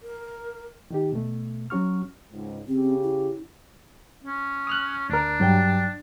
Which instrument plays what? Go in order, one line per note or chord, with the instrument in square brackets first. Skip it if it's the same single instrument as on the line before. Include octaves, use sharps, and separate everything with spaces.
[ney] A#4
[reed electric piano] D#3 D#4 G4
B2 A3
F#3 C#4 F#4 C#6 F6
[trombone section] C#2 G#2
[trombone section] C#3 G4 [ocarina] C4
[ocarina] E4
[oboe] C#4
[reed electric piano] D#6 F6 F#6
[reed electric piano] D2 A#4 [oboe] D4
[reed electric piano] G2 F#3 G5